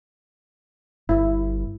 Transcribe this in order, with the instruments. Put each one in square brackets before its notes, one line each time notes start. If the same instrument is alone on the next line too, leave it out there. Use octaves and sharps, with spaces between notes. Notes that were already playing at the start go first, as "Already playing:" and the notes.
[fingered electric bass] G1 [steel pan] E4